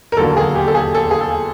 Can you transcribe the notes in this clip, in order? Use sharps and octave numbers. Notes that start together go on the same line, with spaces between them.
A#4
E1 D#2 D3 F#3 A#3 A4
G#4
G4
A4
G#4
A4
G#4
A4